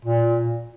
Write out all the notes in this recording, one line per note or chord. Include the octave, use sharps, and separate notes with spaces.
A#2